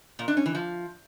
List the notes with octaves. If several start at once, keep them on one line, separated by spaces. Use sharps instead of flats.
A#2
D4
C#4
E3
F3